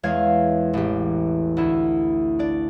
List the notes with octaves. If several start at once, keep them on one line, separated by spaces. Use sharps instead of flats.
E2 G#3 C#5 F5 G#6
A1 G4
D2 E4
D4 D5